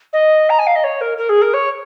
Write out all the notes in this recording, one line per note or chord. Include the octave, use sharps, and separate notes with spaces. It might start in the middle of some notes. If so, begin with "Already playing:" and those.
D#5
A#5
G#5
F5
D#5
C#5
A#4
A#4
G#4
A#4
C#5